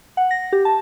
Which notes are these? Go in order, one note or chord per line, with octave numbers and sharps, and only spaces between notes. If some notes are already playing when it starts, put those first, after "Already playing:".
F#5
A#6
G4
A5